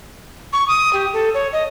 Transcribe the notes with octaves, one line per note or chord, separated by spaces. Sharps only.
C#6
D#6
G4
A4
C#5
D#5